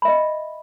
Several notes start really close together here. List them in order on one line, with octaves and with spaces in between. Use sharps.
B5 E5 D#5